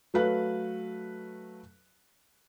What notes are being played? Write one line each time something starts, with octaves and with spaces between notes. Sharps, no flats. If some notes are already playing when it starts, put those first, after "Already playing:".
F#3 A3 B4 F5 F#6